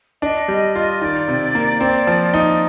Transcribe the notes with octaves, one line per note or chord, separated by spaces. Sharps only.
D4 D#5
G3 D#5
F4 D#5
D#3 D5
C3
A#3
C4
F3
D#4